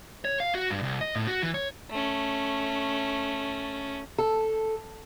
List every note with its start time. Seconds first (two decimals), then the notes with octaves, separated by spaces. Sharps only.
0.25 C#5
0.40 F5
0.55 F#4
0.70 G2
0.83 C2
1.01 D#5
1.15 A2
1.27 F#4
1.43 E3
1.54 C#5
1.90 A3 C#4
4.18 A4